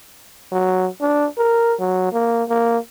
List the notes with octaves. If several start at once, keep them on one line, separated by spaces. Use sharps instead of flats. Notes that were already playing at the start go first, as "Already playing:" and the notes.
F#3
D4
A#4
F#3
A#3
A#3